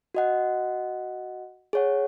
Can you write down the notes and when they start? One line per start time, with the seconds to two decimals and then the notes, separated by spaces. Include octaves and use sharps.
0.15 F#4 D#5 F#5
1.73 G#4 C#5 F#5